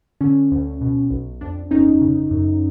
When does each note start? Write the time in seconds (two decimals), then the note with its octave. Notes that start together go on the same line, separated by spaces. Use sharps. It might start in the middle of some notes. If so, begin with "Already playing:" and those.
0.21 D3 C#4
0.52 D2
0.81 B2
1.10 B1
1.41 F2 D4
1.71 G1 C#4 D#4
2.01 C#3
2.31 F#2